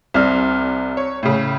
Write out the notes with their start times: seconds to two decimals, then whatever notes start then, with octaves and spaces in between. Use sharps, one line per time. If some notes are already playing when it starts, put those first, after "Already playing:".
0.14 C2 C4 D5 F6
0.97 C#5
1.23 A2 C#3